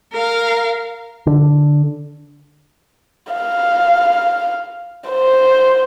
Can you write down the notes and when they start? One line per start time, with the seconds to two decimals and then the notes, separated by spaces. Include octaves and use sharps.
0.12 A#4 F5
1.27 D3
3.33 F5
5.10 C5